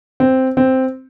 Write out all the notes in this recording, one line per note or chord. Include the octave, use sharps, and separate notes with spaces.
C4
C4